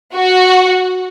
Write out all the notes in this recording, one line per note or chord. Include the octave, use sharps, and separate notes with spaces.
F#4